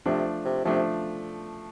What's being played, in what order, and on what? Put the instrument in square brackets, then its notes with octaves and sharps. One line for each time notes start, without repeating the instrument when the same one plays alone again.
[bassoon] C3 [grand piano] F3 A3 D4
[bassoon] C3
[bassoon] C3 [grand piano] F3 A3 D4